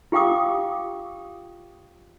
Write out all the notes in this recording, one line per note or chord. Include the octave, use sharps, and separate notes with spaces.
F4 G4 F5 G5 D6 D#6